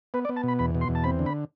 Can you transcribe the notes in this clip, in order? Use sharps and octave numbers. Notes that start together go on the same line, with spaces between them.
B3 B4
D5
B3
A5
B2 B5
E2 B5
B2
C6
E2
A5
C4 B5
D3
B5